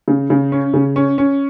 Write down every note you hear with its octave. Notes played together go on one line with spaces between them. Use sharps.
C#3
C#3
C#4
C#3
C#4
C#4